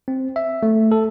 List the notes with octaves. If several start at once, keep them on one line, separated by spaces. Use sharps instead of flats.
C4
E5
A3
A4